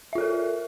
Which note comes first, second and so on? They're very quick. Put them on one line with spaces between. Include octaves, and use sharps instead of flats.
E5 F4 A4 A#4